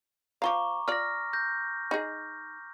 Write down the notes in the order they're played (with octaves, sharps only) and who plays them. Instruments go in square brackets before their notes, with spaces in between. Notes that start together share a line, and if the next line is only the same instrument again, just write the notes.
[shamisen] F3 F4 F5 [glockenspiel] A#5 C#6 D6
[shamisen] F4 D5 [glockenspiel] F6 A#6
[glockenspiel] G6 A#6
[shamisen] D#4 G#4